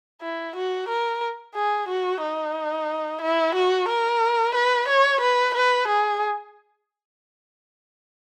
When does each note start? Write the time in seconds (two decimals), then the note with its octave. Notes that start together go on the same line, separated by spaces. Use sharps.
0.22 E4
0.56 F#4
0.89 A#4
1.55 G#4
1.88 F#4
2.22 D#4
3.21 E4
3.55 F#4
3.88 A#4
4.55 B4
4.88 C#5
5.21 B4
5.54 B4
5.88 G#4